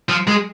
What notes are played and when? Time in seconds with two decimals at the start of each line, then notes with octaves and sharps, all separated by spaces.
0.09 F3
0.27 G#3